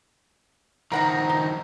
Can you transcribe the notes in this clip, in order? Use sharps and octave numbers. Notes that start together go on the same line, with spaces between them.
D#3 F3 A#4 F#5 A#5
D#4